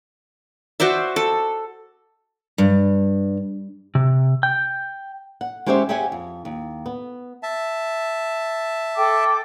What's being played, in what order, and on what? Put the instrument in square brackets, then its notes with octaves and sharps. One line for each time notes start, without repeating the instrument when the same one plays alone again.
[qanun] F#4 C5 D5 E5
A4
[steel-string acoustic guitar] G2
[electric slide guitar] C3
G5
[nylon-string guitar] F#5
G#3 C#4 G4 C5 C#5 E5
G4 G#4 C#5 E5 F#5 G#5
F2
D#2
B3
[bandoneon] E5 A5
[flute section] A4 G5 D6